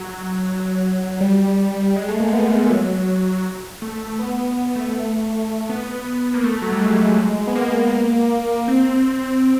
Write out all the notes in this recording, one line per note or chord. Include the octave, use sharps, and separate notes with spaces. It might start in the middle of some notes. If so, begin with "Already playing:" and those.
Already playing: F#3
G3
G#3
A3
A#3
B3
F#3
A3
B3
B3
A3
B3
A#3
A3
F#3
G3
G#3
B3
A#3
C4